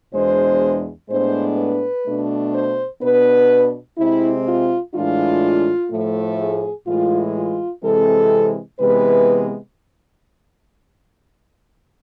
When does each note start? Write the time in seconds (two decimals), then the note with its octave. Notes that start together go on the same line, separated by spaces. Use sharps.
0.14 E2 B2 G#3 D4 C5
1.10 A2 G#3 B3 D4 C5
1.58 B4
2.06 B2 A3 D4
2.53 C5
3.02 B2 B3 D4 B4
3.98 C3 G#3 C4 E4
4.47 F4
4.94 A2 E3 G#3 D4 F4
5.91 A2 F3 A3
6.39 G#4
6.86 A2 E3 G#3 F4
7.35 F4
7.83 C3 E3 G#3 C4 A4
8.79 C3 E3 G#3 B3 B4